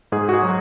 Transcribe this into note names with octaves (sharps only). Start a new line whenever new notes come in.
G#2 G#4
F#4
G#4
F#3